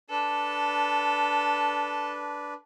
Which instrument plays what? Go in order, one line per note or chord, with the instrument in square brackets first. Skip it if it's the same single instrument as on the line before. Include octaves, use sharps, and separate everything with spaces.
[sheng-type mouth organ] D4 B4 [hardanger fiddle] A4